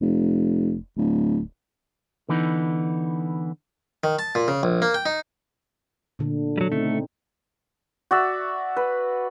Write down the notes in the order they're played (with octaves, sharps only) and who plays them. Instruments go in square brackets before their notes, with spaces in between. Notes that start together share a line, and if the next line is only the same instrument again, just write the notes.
[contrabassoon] F1
D1
[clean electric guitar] D3 E3 B3 D#4
[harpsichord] D#3
A5
A#2
C#3
A#1
A#3
G5
D#4
[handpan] A#2 D3
[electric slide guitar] F#3 G3
[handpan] C#3 C4 D#4 [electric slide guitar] A3
[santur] F#4 D5 E5
B4